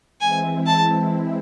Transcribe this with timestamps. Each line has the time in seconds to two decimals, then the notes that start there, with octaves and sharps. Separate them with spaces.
0.20 E3 G#3 C4 E4 G#5
0.67 A5